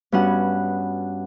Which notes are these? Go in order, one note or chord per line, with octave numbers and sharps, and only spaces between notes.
G2 B3 C#4 F#4 F#5